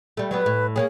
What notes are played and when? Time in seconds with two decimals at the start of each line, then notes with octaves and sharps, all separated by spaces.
0.17 G3 A3
0.31 F#3 G3 B3 B4
0.46 A2
0.76 A#3 B3 G#4 C#5